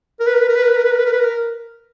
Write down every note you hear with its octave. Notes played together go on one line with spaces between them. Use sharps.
A#4
B4
A#4
B4
A#4
B4
A#4
B4
A#4
B4
A#4
B4
A#4
B4
A#4